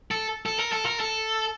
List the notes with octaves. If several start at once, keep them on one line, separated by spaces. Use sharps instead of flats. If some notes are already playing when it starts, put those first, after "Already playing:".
A4
A4
A#4
A4
A#4
A4